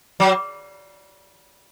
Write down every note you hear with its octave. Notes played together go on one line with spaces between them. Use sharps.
F#3